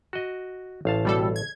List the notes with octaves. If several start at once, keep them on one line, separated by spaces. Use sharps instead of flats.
F#4 D#5
A1 F5 A5
B2 G3 A4
G#6